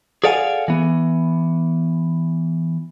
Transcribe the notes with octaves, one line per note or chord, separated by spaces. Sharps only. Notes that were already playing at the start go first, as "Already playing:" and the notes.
G#4 A4 D5 F5 F#5 G#5
E3 B3